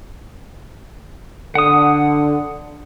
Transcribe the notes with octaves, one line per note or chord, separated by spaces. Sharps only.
D3 F#5 D#6